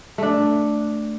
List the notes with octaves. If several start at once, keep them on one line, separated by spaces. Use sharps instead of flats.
A3 D4